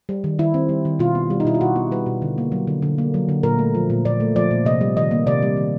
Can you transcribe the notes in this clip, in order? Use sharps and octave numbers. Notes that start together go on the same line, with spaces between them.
G3
D#3
D#3 E4
C4
G3
D#3
B2 F4
B3
G3
D#4
B2 E4
F4
B2 F#4
B3
G3 B4
B2
D3
A#3
F#3
D3
D3
A#3
F#3
D3
A#2 A#4
A3
F3
A#2
A#2 D5
A3
F3 D5
A#2
C3 D#5
G3
D#3 D#5
A#3
C3 D5
G3
D#3